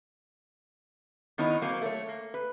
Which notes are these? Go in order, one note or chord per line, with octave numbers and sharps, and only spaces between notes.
D#3 B3 D#4 E4 C#5
F#3 A#3 C4
A3 C#5
A#3
B4